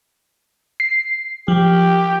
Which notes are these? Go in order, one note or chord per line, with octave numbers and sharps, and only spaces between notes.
C7
F3 G4